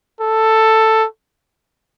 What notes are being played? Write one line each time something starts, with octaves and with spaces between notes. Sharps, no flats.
A4